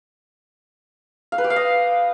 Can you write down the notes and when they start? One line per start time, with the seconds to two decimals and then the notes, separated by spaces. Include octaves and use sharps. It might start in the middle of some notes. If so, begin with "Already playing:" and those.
1.32 F5
1.38 B4
1.44 G4
1.50 F5
1.56 D#5